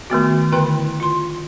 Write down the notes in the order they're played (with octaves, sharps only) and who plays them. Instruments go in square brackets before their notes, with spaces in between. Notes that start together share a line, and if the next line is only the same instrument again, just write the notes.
[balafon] D#3 A3 B3 F#4
D3 E4 B4 G5
F4 C6